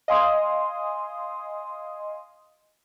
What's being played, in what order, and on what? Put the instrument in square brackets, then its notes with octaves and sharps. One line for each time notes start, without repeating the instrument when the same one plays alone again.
[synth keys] D#5 F5 G#5 C6 D#6